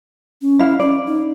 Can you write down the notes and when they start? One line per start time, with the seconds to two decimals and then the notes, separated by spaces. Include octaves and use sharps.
0.42 C#4
0.59 E4 F5
0.80 C#4 D5
1.06 D#4